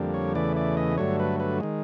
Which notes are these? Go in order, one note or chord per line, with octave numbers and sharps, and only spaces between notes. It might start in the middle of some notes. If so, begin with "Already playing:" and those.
Already playing: F2 D3 G3 A#3
C#5
E2 C#3 E3 A3 D5
D5
D#5
G2 D3 F#3 A3 C#5
B4
B4
D#3 G#3